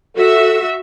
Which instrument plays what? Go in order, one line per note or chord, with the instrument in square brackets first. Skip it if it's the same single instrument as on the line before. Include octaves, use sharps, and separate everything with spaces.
[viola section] F#4 E5 [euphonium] A4